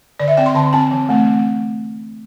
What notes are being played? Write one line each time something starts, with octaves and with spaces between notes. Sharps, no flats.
D3 D5
E5
C4 G5
C6
D3 A5
C4 A5
E3
A3 C4